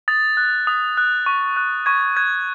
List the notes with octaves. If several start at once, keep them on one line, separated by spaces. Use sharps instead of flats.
D#6 A6
F#6
D#6
F#6
C#6
F#6
C#6 G#6
F#6 G#6